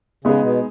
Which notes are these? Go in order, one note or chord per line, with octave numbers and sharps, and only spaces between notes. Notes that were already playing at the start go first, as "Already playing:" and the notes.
C#3 G#3 B3 D#4 G#4
B2